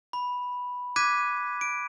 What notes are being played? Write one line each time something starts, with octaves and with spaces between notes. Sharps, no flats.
B5
D6 F#6 G#6 B6 D#7
D7